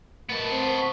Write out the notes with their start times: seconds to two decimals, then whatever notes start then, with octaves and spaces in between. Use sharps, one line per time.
0.29 B3 A#4 A5
0.50 C4 C5
0.77 C#6